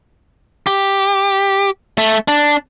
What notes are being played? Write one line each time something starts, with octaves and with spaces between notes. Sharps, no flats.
G4
A3
D4